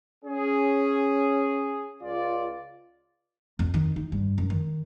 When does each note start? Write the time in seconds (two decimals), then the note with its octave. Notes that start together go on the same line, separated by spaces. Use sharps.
0.25 C#4 G#4
2.02 C#2 F4 D5
3.59 F2
3.74 D#3
3.96 D#4
4.12 G2
4.38 F#2
4.50 D#3